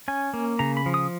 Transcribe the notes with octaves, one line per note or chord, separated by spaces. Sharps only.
C#4 G#5
A#3
C#3 A#5
B5
F3
D#6